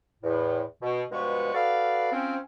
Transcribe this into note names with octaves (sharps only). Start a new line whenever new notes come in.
E2 A2
B2
G2 B2 F3 G#3 B4 C#6
F#4 A4 B4 D5 F5
F3 C4 C#4